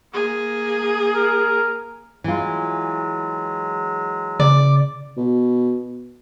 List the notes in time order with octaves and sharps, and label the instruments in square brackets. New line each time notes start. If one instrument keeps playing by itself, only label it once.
[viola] A#3 G#4
[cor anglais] A#4
[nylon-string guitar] E3 F4 [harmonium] F#3 G#3
[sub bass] C#3 [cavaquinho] D5
[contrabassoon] B2